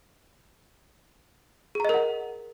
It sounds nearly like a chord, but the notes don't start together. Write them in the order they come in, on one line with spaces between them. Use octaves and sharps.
G#4 A#5 D#5 A#4 F#5